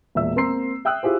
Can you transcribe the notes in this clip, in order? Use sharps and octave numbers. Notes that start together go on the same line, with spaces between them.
E1 A#2 E5 E6
A#3 C4 A#5 C6 C7
E5 G5 D#6 E6 F#6
E4 F4 G4 G#4 C5